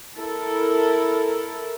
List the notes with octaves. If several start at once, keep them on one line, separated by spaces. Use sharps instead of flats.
E4 A4 A#4